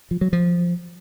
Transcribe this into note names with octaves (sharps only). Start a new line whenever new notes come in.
F3
F#3
F3